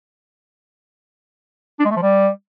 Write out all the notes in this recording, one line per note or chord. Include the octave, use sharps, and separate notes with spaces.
D4
G#3
A3
F3
G3